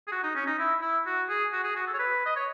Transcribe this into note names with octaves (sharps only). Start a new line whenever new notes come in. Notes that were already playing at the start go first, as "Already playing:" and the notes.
G#4
F#4
D#4
C#4
D#4
E4
E4
F#4
G#4
F#4
G#4
F#4
A4
C#5
B4
D#5
C#5